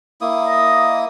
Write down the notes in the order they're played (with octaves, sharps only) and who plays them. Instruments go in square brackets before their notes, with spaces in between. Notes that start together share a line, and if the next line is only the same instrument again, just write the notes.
[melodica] A#3 E4 D#6
[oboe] D#5